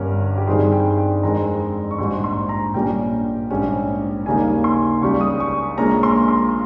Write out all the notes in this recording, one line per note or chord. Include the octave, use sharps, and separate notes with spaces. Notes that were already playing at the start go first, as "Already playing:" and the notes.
Already playing: G1 G2 G3 C#4 A#4
G4
G2 G3 C4 D#4 G#4
G5
G5
F2 D#3 G#3 C4 A#5
C#6
A#1 G#2 G3 C6
C6
A#5
A#1 A#2 G3 C#4 G5
A#1 G#2 G3 C#4
D#2 C#3 G3 A#3 D#4 G#5
C6
C#2 C#3 G3 C#6
D#6
C#6
A#1 A#2 G#3 C#4 A#5
C6
C6